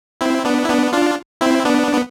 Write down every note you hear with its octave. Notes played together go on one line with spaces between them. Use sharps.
C4 E4
B3 D4
E4
B3 D4
D4 F4
C4 E4
B3 D4
B3